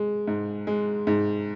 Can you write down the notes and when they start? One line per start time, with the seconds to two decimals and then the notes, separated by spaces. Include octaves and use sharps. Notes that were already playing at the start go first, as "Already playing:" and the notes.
Already playing: G#3
0.28 G#2
0.67 G#3
1.07 G#2